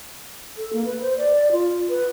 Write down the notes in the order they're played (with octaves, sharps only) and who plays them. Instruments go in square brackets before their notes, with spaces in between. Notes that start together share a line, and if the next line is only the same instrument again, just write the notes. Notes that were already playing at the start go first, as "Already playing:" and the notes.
[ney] A4
A#3
B4
C5
D5
F4
B4